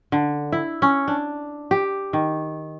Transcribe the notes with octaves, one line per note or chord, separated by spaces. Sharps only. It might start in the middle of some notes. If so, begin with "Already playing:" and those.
D3
E4
C#4
D4
G4
D#3